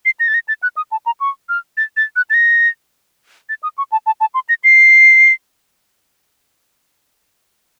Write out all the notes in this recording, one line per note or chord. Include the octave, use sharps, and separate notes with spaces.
C7
A#6
A6
A#6
A6
F#6
D#6
A5
A#5
C#6
F6
A6
A6
F#6
A6
A#6
A6
D#6
C#6
A5
A5
A5
C6
A#6
C7